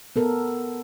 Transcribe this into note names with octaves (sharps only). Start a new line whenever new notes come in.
B3 A4 A#4